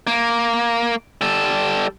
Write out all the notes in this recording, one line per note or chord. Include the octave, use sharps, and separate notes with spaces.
A#3
G3 A4